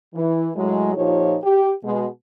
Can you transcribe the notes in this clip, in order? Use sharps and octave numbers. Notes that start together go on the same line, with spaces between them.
E3
A2 F#3 G#3
A#2 F3 D#4 G4 C#5
G4
B2 G#3